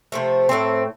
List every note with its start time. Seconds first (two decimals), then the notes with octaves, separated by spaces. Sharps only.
0.12 C3 F3 A3
0.49 A2 A3 C4